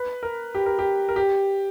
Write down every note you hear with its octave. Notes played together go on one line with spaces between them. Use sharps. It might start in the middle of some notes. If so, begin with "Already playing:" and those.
Already playing: B4
A#4
G4
A#4
G4
A#4
G4